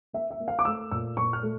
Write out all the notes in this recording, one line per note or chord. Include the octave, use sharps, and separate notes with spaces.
A#3 E5
E5
A#3
F5
D6
A3 E6
A#2 E6
A#2 C#6
F6
A3